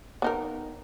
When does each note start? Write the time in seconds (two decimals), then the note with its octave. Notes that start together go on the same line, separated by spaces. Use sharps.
0.22 B3 D#4 A#4